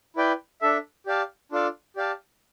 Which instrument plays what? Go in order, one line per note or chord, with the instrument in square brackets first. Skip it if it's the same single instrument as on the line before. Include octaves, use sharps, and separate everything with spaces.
[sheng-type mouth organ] E4 B4 D5 G5
D4 A4 E5
G4 D5 F5 A5
D4 F4 A4 D5 F5
G4 D5 F5 A5